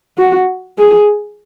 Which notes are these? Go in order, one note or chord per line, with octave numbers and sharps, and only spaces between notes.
F#4
G#4